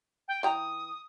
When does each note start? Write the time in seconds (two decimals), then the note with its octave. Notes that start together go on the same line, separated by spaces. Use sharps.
0.28 G5
0.43 E3 G5 A#5 D#6